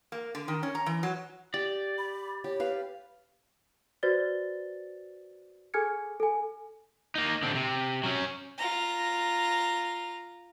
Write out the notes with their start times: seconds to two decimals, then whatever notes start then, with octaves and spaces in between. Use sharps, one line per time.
0.12 A#3
0.35 D3
0.48 D#3
0.63 C#4
0.75 A#5
0.86 E3
1.03 F#3
1.54 G4 D5
1.98 B5
2.44 G4 C#5
2.60 B4 F5
4.03 F#4 B4 C5 D5 A6 G7
5.74 G#4 A4 G#5 F6 G#6 C#7
6.20 A4 G#5
7.15 A#3 D#4
7.43 D3 C4
7.55 C3
8.03 F#3 C#4
8.58 F4 A#5